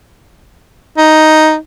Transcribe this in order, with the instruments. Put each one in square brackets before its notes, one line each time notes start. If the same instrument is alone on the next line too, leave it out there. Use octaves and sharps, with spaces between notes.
[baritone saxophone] D#4